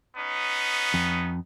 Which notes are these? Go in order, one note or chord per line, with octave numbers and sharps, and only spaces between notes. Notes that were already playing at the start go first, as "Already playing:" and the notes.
B3 C#4 D#4
F2